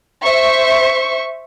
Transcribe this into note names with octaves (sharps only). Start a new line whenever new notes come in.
C5 E5 C#6